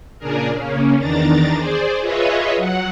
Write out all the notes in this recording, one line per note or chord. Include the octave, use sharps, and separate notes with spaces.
A#2 C#3 D4 G#4 A#4
C#3 A#3 C#4
E2 D#3 D4 A#5 A6
G#4 C5 D5
F4 G#4 B4 C#5 D#5 E5
F#3 F#5